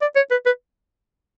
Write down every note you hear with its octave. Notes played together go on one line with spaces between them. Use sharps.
D5
C#5
B4
B4